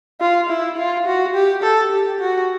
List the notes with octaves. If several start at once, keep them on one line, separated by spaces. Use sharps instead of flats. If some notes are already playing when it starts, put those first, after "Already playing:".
F4
E4
F4
F#4
G4
A4
G4
F#4